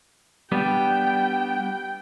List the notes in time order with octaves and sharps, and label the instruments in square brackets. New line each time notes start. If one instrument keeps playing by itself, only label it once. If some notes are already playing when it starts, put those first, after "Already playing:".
[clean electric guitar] G3 B3 D4 [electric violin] G5